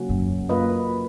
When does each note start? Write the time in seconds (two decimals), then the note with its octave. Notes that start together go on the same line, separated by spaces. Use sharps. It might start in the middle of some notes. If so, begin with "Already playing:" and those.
Already playing: C#3 F#3 A#3 C#4 F#4
0.09 F#2
0.49 A#3 F4 B4 D#5